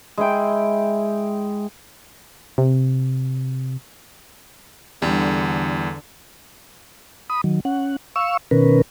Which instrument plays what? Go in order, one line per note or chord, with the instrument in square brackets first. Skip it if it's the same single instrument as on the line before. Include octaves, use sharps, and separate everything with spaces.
[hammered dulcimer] G#3 E4 G5
[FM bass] C3
[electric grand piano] E2 [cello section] D3 [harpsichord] G3
[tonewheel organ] B5 D#6
D#3 F#3
C#4 F#5
F5 C#6 E6
B2 D#3 C#4 A#4 B4